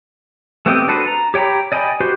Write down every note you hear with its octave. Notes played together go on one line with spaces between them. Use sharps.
A3 B3 C4 G4 D#5
D4 F#4 A4 B4 C5
A#5
G4 C#5 G5 A#5 B5
D5 D#5 G5 G#5 B5
F#4 G4 B4 C5